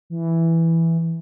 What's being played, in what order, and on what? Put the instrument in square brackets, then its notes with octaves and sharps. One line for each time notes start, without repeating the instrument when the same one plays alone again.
[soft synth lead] E3